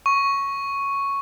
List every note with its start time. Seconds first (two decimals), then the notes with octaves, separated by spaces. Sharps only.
0.06 C#6